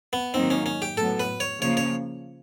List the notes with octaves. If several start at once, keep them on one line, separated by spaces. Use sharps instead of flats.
B3
G#2 D#3 F#3 A#3 C4 D#4
C#4
C#4
G4
A2 F#3 B3 A4
B4
C#5
C#3 F3 A#3 C#4 C#5
C#5